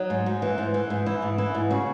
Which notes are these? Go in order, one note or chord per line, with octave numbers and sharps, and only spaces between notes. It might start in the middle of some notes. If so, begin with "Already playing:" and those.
Already playing: F#3 D#4
G#2
G#2
E3
G#2
E3
G#2
E3 E4
G#2
E3 E4
G#2
C#3 F#4